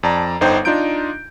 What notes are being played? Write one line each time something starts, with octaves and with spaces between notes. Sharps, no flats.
F2 D5 A5 A#5
G1 D3 D#4 C5 G5
D4 D#4 F4 A#5 G6 D7